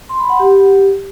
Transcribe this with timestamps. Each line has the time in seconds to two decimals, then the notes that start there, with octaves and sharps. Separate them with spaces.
0.09 C6
0.19 B5
0.29 F#5
0.40 G4